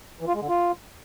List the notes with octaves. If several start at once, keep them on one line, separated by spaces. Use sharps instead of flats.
E3
F4
G#3
D3
F4